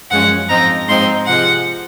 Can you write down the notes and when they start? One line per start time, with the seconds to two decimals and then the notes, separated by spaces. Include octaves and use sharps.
0.10 F#2 F3 G#3 C#4 F#5
0.49 G#2 F3 C4 D#4 A#5
0.87 G#2 F3 G#3 C4 D#4 C6
1.26 C3 F3 G#3 F#5